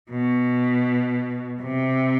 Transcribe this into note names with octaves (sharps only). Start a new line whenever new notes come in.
B2
C3